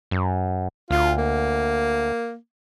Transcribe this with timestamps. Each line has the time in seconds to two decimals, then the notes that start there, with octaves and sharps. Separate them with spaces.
0.11 F#2
0.91 D2 F4
1.17 A#3